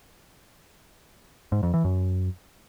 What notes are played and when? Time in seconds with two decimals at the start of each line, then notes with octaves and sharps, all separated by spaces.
1.52 G#2
1.63 F2
1.74 E3
1.84 F#2